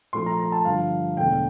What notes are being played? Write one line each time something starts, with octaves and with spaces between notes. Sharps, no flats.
A#1 A#2 F3 A3 C6
A#5
A#5
A5
G2 D3 F3 F5
E1 E2 D3 A3 G5